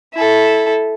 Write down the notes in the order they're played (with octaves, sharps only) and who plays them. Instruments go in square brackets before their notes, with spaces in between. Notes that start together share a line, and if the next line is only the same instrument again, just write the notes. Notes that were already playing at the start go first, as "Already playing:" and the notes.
[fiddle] E4 A4